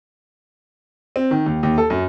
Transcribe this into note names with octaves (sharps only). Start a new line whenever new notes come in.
C4
D#3
D#2
D#2
A4
F#2